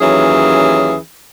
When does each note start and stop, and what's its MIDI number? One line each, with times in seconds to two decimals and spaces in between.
0.01 0.95 39
0.01 0.95 52
0.01 0.95 54
0.01 0.95 61
0.01 0.95 68